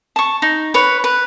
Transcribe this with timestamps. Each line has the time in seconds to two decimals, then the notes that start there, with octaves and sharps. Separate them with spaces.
0.16 A5 C#6
0.42 D#4
0.74 B4 C#5
1.04 B4